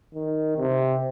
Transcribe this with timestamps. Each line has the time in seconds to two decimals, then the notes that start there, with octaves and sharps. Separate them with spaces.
0.15 D#3
0.58 C3